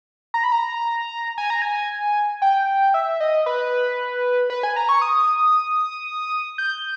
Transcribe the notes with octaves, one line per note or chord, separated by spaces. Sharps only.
A#5
B5
A#5
G#5
A#5
G#5
G5
E5
D#5
B4
B4
G#5
A#5
C#6
D#6
G6